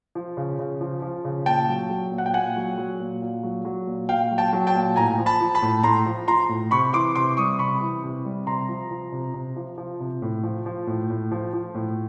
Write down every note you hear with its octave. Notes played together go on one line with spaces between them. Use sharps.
F3
C#3
C#3
F3
F3
C#3
A#2 G5 A5
F#3
F#3
A#2
F#5
G5
A#2 F#5 G#5
F#3
F#3
A#2
A#2
F#3
F#3
A#2
A#2 F5 G5
F#3
G5 A5
F#3
G5 A5
A#2
A2 G#5 A#5
F3
A5 B5
F3
A5 B5
A2
A2 A#5 C6
F3
F3 A#5 C6
A2
C3 B5 C#6
E3 C6 D6
C3 C6 D6
G3 C#6 D#6
C3 B5 C#6
E3
C3
G3
C3 A#5 C6
F3
F3
C3
C3
F3
F3
C3
A2
F3
F3
A2
A2
F3
F3
A2